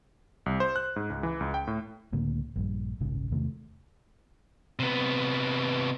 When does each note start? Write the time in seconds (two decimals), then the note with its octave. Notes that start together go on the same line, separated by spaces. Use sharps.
0.46 C2
0.60 C5
0.76 F#6
0.96 G#2
1.10 C#2
1.23 E3
1.41 C#2
1.54 G5
1.67 A2
2.13 C#2 A2 D3 A#3
2.56 A#1 G2
3.00 E1 A#1 G#2 C#3
3.31 E2 C3 D#3 A3
4.79 C3 B3